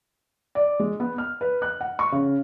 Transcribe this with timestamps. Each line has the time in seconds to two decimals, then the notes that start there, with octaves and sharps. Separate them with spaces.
0.55 D5
0.80 G#3
1.00 B3
1.18 F6
1.41 B4
1.62 F#6
1.81 F#5
1.99 C#6
2.12 C#3